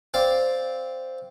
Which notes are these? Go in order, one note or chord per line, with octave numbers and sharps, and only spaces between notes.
C4 D5 F5